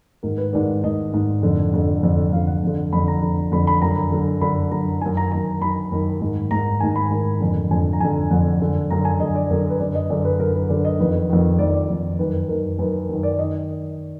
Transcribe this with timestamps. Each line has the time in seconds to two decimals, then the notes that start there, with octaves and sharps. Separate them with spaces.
0.23 G#2 D#3 A#4
0.38 B4
0.53 G#2 D#3 D5
0.83 G#2 D#3 D#5
1.13 G#2 D#3
1.43 F2 D3
1.73 F2 D3
2.03 F2 D3
2.33 F2 F5
2.36 D3
2.47 F#5
2.63 F2 D3
2.93 F2 D3 B5
3.08 A#5
3.23 F2 D3
3.52 F2 D3 B5
3.67 B5
3.82 F#2 D3 A#5
4.12 F#2 D3
4.41 F#2 D3 B5
4.71 F#2 D3 A#5
5.01 F#2 D#3 G#5
5.17 A#5
5.32 F#2 D#3 A#5
5.61 F#2 D#3 B5
5.92 F#2 D#3
6.21 G#2 D#3
6.51 G#2 D#3 A#5
6.80 G#2 D#3 G#5
6.96 B5
7.11 G#2 D#3
7.40 F2 D3
7.71 F2 D3 G#5
7.93 A#5
8.00 F2 G#5
8.05 D3
8.30 F2 D3 F#5
8.60 F#2 D3
8.90 F#2 D3 A#5
9.05 G#5
9.20 F#2 D3 D#5
9.35 D5
9.50 F#2 D3 A#4
9.70 B4
9.79 F#2 D3 D5
9.95 D#5
10.09 F#2 D3 D5
10.25 B4
10.39 F#2 D3 A#4
10.54 B4
10.69 F#2 D3 D5
10.85 D#5
10.99 F2 D#3 B4
11.30 F2 D#3
11.59 F2 D#3 D5
11.74 D5
11.89 F2 D#3
12.19 F#2 D#3 B4
12.49 F#2 D#3 A#4
12.79 F#2 D#3 B4
13.09 F#2 D#3
13.23 D5
13.39 D#5
13.42 D#3